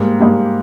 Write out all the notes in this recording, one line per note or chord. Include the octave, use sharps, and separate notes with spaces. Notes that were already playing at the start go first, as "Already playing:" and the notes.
Already playing: G#2 G3 A#3
G#2 G3 A#3